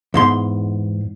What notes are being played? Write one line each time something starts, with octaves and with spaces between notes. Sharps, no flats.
E2 G#2 C6